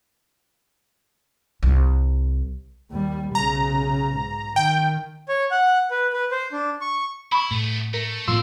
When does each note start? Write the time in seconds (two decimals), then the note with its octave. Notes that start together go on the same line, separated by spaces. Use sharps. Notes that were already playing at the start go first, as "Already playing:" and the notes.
1.63 C2
2.91 D#2 G3
3.35 B1 C#3 A#5
4.14 G#2
4.56 D#3 G5
5.28 C#5
5.51 F#5
5.91 B4
6.13 B4
6.32 C5
6.52 D4
6.81 C#6
7.32 E4 B5 C#6
7.51 A2 A3 B3
7.94 A3 A#4
8.28 A2 D#3 F3 A3 B3 D4 C6 E6